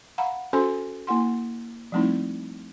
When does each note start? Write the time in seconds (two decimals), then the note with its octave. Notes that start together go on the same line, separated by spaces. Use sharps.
0.18 F5 F#5 A#5 B5
0.53 C#4 F#4 A4 C5 G#5 C6
1.07 A#3 E4 F#5 C6
1.92 F3 G3 A3 C4 D#4 E4